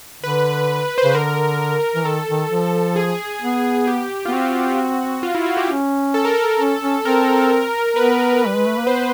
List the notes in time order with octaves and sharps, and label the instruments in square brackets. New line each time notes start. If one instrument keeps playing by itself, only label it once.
[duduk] D3 [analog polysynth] B4
[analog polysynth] C5
[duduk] C#3 [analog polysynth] B4
[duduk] D3 [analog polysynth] A#4
[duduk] E3
[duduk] D#3 [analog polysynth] A4
[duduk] D#3
F3
[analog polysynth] G#4
[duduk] B3
[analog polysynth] G4
F4
[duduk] B3
[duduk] C4 [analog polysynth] F#4
[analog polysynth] F4
E4
F#4
G4
[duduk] C#4
[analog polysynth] A4
A#4
A4
[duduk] C#4
C#4
[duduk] C4 [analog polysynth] A#4
[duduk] B3 [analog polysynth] B4
[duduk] G3
G#3
A3
A#3
[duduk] B3 [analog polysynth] C5